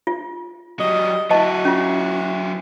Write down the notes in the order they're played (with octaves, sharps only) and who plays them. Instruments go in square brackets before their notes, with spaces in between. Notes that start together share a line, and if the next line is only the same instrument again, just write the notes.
[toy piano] F4
[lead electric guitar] F#3 G3 [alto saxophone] D#5
[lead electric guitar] F#3 E4 [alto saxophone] F#4 [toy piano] D#5 A5
[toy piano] C#4 F4